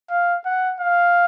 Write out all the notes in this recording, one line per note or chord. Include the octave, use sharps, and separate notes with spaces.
F5
F#5
F5